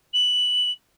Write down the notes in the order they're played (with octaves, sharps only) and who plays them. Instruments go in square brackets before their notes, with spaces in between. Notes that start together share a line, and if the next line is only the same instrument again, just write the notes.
[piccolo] F#7